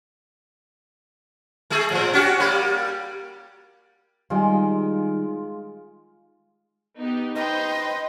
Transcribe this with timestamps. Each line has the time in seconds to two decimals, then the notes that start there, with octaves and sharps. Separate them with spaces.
1.70 G#3 A3 G#4
1.90 A2 F3
2.13 C#4 F#4 G4
2.40 G3 A#3
4.30 D#3 G3 G#3 F4
6.98 B3 D#4 G4
7.36 D#4 B4 C5 D#5 G5 C6